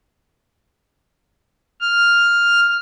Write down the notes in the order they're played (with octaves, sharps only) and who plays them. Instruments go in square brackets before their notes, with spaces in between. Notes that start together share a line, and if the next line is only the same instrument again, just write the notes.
[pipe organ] F6